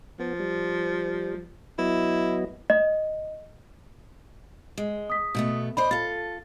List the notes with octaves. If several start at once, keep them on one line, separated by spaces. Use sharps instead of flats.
F3 B3
G3
F#3 B3 E4 D#5
D#5
G#3
D#6 B6
B2 A3 B3
C5 D5 D#5 B5
F4 A4 A6